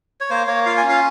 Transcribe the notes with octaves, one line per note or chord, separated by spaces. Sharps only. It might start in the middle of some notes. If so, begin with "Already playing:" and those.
C#5
A#3 C5
A#3 C#5
F4 F5
G#5
C#4
F5